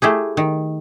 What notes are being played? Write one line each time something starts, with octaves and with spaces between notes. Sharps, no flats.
A3 E4 G4 G#4
D#3